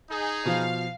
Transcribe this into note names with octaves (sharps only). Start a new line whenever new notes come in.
D#4 G#4
B2 F3 F5